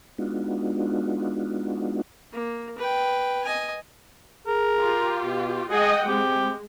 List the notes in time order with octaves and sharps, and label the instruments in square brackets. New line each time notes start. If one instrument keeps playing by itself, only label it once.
[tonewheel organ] G#3 B3 D4 D#4 F4 F#4
[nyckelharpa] A#3
B4 G5
D#5 G#5
[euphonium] G#4 [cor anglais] A#4
[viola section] F4 G4
[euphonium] B2
[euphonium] G#3 [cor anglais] G#4 [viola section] D#5 F#5 G5
[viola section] G#3 [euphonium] C4 [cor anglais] G4